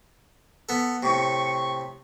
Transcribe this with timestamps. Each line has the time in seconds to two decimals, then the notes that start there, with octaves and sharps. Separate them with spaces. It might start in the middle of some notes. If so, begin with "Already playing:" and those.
0.69 B3 A4
1.03 A2 C3 C#6